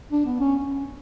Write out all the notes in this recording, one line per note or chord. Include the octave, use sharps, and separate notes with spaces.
D4
B3
C#4